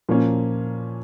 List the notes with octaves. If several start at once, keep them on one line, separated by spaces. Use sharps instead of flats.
A#2 F3 A#3 C#4